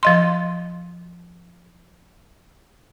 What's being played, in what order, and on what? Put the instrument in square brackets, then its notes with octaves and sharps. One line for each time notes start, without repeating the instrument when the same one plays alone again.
[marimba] F3 D#5 C6